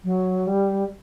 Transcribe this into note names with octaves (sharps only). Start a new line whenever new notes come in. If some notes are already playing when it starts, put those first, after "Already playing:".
F#3
G3